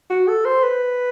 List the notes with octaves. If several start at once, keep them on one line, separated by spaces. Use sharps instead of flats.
F#4
A4
C5
B4